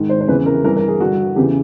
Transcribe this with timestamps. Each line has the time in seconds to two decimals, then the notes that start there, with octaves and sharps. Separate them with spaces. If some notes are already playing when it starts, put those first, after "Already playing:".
Already playing: G#2 D#3
0.09 C5
0.21 C5
0.28 E2 C#3 E3 B4
0.46 A#4
0.64 G2 E3 A#4
0.77 A#4
0.88 G#4
1.00 G2 D3 F#4
1.36 E2 C#3 E3 G4